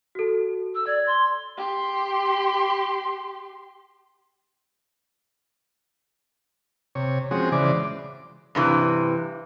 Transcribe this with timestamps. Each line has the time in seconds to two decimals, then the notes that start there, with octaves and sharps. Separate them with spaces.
0.15 F#4 A4
0.75 E6
0.87 D5 G#6
1.07 C6
1.57 G4 C6
6.95 C3 C#5
7.31 F3 G#3 C4 C#4 F#4 G#4
7.52 C#3 E3 G#3 C5 D5 D6
8.55 G2 C3 E3